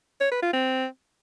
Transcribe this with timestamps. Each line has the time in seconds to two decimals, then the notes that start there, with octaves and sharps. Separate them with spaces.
0.21 C#5
0.31 B4
0.42 F4
0.53 C4